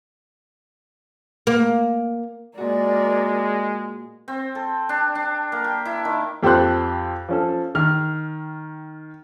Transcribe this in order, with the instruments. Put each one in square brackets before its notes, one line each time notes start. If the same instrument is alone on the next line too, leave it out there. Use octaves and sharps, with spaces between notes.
[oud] A#3
[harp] A#2 F#4 [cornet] G#3 [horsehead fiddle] A#4 D5
[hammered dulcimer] C4
A4
D4
D4
A#3
G4
E4
D#3
[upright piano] F2 G4 A4 C5 C6 F#6
F3 C#4 A4
D#3 F6